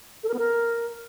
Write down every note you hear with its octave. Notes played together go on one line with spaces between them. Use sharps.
A4
A#4
B3
A#4